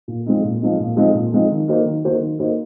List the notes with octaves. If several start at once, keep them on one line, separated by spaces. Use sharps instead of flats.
A#2
F3 G#3 C4 D#4
A#2
F3 G#3 C4 D#4
A#2
F3 G#3 C4 D#4
A#2
F3 G#3 C4 D#4
D#3
A#3 D#4 F#4 C5
D#3
A#3 D#4 F#4 C5
D#3
A#3 D#4 F#4 C5